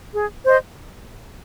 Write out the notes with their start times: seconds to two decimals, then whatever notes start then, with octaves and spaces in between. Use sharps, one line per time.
0.15 G#4
0.45 C5 D#5